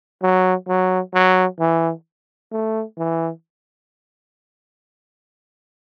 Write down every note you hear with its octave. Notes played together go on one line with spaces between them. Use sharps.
F#3
F#3
F#3
E3
A3
E3